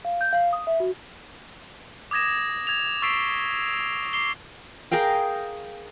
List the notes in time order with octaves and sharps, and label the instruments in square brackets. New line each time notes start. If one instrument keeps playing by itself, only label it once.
[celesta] F5
G6
F5
D#6
E5
F#4
[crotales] D6 D#6 G#6 A#6 E7
G#6 F7
C#6 E6 A6 B6 C7 D7
D6 C7 G7
[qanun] G#4 A#4 F5 G5